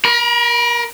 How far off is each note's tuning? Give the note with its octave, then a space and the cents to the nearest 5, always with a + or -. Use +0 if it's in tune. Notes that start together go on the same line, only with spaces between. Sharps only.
A#4 +25 B5 -35